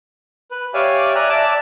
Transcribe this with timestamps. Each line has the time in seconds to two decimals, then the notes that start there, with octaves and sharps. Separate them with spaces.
0.51 B4
0.74 G4 C#5 D5 E5 F5 G#5
1.15 D5 E5 G#5 A#5 F6 F#6
1.29 D5 E5 A5 D6